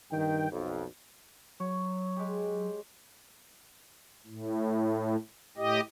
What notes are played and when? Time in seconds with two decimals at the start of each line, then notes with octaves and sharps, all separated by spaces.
0.12 G2 D#3 G5
0.52 B1 F2
1.60 F#3 C#5
2.16 G#3 G4
4.26 A2
5.57 A2 G4 D#5